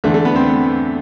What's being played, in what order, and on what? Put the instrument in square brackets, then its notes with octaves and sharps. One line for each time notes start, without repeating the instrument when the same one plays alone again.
[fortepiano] E2 D3 A3
A3
B3
C4
B3